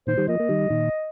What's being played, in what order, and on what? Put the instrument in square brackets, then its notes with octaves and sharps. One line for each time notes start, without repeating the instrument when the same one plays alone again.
[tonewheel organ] A#2 D#3 [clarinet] C5
[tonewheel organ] D#3 G3
[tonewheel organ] F3 A#3 [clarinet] D#5
[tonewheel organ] A#3
D#3 G3
A#2 D#3